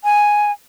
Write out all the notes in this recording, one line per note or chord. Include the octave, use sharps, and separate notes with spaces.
G#5